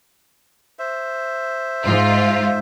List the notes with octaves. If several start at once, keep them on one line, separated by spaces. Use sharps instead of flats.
C5 E5
G#2 F4